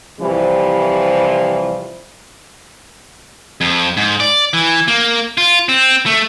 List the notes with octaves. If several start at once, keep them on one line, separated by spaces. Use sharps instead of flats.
C3 E3 F3 G3 E4
F2
G#2
D5
E3
A#3
F4
C4
A3